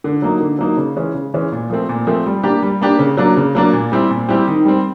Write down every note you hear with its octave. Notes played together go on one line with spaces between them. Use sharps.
D3
F#3 A#3 D#4
D3
F#3 A#3 D#4
C#3
E3 G#3 C#4
C#3
E3 G#3 C#4
A#2
F3 A3 C4
A#2
F3 A3 C4
G3
A#3 D4 G4
G3
A#3 D4 G4
C#3
F#3 A#3 D4
C#3
F#3 A#3 D4
A#2
G3 C4 E4 G4
A#2
G3 C4 E4 G4
D#3
G3 C4